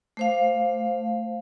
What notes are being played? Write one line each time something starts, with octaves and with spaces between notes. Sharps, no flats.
A3 C5 F5